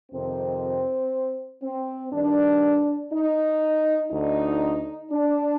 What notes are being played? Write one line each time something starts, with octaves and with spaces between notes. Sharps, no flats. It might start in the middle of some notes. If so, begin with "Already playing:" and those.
F2 C3 D#3 C4
C4
G2 D#3 D4
D#4
D2 D3 D#4
D4